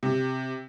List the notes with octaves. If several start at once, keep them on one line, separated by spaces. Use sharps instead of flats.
C3